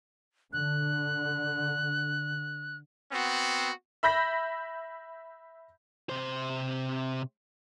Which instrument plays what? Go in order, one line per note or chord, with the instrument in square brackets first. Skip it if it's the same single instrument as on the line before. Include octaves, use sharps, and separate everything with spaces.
[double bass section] D3 [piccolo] F#6
[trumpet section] B3 C4 F#4
[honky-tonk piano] E5 B5 G6 A#6 B6
[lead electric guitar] C3 C5